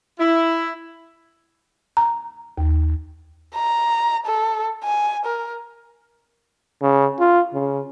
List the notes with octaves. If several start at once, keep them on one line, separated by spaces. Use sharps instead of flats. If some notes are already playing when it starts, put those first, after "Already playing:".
E4
A#5
D#2
A#5
A4
G#5
A#4
C#3
F4
C#3